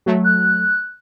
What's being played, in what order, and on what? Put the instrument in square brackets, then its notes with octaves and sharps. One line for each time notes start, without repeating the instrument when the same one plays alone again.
[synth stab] F#3 A3
[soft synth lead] F#6